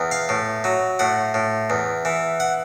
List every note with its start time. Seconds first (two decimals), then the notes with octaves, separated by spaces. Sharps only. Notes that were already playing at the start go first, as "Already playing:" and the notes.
Already playing: E2
0.11 F5
0.29 A2
0.64 F#3
0.99 A2 F#5
1.34 A2
1.70 E2
2.05 E3
2.40 F#5